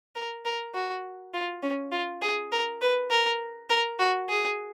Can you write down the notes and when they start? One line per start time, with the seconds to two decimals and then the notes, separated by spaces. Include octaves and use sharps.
0.15 A#4
0.45 A#4
0.74 F#4
1.34 F4
1.63 C#4
1.92 F4
2.22 G#4
2.52 A#4
2.82 B4
3.10 A#4
3.70 A#4
3.99 F#4
4.29 G#4